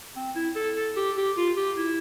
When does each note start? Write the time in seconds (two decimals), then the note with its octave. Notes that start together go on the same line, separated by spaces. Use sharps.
0.16 C4
0.35 E4
0.56 A4
0.76 A4
0.96 G4
1.17 G4
1.37 F4
1.57 G4
1.77 E4